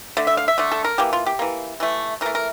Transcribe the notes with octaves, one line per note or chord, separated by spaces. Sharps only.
D3 A3
E5
F5
E5
D3 A3
A4
A#4
E3 A#3 G4
F4
G4
E3 A#3
E3 A3
E3 A3 A#4
A#4